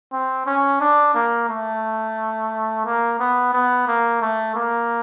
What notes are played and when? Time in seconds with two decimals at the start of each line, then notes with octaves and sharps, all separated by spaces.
0.13 C4
0.46 C#4
0.80 D4
1.15 A#3
1.49 A3
2.85 A#3
3.19 B3
3.53 B3
3.87 A#3
4.21 A3
4.55 A#3